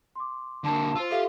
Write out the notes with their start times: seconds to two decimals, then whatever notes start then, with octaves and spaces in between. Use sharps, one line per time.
0.16 C6 D6
0.64 D3 A#3 A5
0.95 F4 C5 E6
1.11 G4 A4 E5 F5